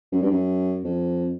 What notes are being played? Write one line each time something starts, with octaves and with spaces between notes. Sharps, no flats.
F#2
G2
F#2
F2